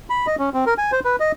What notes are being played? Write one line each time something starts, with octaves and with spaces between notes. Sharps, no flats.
B5
D#5
C#4
C4
A#4
G#5
C5
B4
D#5